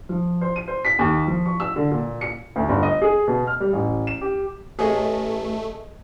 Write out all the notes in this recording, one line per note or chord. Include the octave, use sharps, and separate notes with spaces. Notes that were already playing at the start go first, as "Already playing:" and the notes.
F3
C5
D#7
C5
B6
D#2
F3
C#6
E6
D3
A#2
C#7
D2
G1
D#5
G#4
B2
F6
G3
A1
E7
G4
A1 A3 G#4 C#5 D#5